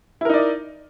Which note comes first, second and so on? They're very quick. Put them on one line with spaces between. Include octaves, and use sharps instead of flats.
E4 A#4 D#4 D5 D#5